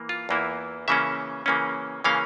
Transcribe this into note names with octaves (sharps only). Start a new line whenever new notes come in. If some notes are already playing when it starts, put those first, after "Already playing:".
Already playing: E3 A#3
F4
E2 E3 A#3 E4
C#3 E3 A#3 C#4 E5
C#3 E3 A#3 C#4
C#3 E3 A#3 C#4 F5